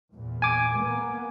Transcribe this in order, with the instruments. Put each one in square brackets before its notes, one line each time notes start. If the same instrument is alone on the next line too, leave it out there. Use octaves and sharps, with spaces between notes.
[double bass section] E2 A#2
[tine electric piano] G#5 D6
[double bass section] A#3 B3